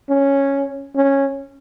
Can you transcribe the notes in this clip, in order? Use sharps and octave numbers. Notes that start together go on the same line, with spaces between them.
C#4
C#4